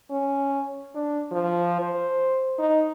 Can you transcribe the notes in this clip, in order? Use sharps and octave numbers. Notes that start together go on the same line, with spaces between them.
C#4
D4
F3
C5
D#4